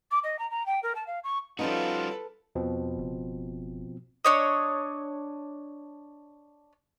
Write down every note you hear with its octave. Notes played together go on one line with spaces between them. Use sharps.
D6
D#5
A#5
A#5
G5
A#4
A5
F5
C#6
F3 G3 C#4 D#4 F4 F#4 A4 B4
E2 B2 F3 C4
F#1
D4 C#5 D#5